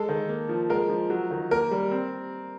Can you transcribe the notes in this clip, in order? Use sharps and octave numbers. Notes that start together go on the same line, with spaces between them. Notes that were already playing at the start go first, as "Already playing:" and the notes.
Already playing: G#3 A4
D#3
A#3
F3
G#3 A#4
F3
F#3
D#3
A#3 A#4
G3
C4